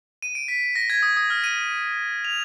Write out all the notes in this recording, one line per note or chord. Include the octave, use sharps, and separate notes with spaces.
D#7
D7
B6
A#6
G#6
D#6
D#6
F6
D#7
F7